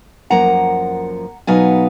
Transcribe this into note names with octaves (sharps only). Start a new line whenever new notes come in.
F#2 F3 A#3 F#5 A#5
B2 F#3 B3 D#4 F5 G#5